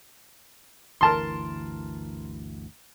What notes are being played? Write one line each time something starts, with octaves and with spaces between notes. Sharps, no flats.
G1 D2 E3 A#4 A5 C6